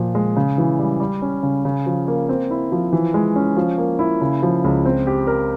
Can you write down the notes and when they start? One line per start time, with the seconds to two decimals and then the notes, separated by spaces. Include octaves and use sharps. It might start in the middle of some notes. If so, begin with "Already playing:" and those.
Already playing: A#2 F3
0.15 G#3
0.36 C#3
0.58 E3
0.79 G3
1.00 G3
1.22 C#4
1.43 C#3
1.65 C#3
1.86 F3
2.08 A#3
2.29 C4
2.51 E4
2.72 F3
2.93 E3
3.14 G#3
3.36 C#4
3.57 F3
3.78 A#3
3.99 E4
4.21 C#3
4.43 F3
4.64 C#2
4.85 C4
5.07 G4
5.27 A#4